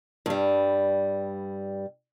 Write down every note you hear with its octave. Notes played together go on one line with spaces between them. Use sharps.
G2 G3